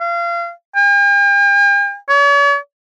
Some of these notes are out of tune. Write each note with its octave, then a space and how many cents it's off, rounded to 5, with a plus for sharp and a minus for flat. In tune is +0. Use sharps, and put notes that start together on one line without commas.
F5 -30
G5 +45
C#5 +45